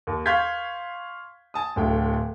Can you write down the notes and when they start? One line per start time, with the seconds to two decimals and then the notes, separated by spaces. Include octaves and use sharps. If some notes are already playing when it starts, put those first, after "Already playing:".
0.07 D#2
0.26 F5 C6 C#6 G6 G#6 B6
1.54 G#5 A5 D#6
1.76 D1 D2 G5